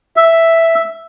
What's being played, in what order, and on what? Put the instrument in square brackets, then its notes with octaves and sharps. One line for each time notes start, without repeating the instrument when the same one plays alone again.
[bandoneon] E5